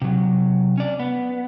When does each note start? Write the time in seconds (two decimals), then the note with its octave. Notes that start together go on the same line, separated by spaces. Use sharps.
0.02 C3 F#3
0.78 C#4 D5
1.00 B3